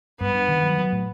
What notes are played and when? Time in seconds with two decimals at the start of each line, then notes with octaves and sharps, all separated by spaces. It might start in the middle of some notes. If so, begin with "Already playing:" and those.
0.20 G2 B3
0.34 G2
0.48 D#3
0.63 F#3
0.78 F#3
0.92 A2